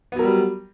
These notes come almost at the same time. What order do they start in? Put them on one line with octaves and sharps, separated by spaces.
B3 F#3 A#4 G3